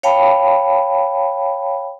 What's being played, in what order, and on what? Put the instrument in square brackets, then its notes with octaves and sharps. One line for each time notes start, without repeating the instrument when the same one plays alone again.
[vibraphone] C#5 F5 G5 A5 B5